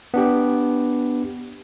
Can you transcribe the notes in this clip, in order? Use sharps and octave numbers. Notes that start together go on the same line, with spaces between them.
B3 D4 G4